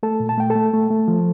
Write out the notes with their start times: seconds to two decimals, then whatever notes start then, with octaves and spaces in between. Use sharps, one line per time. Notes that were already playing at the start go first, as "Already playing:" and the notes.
0.03 A3 A4 A5
0.20 A#2
0.29 A5
0.38 A3 G5
0.50 A4 A5
0.56 A3
0.73 A3
0.90 A3
1.08 F3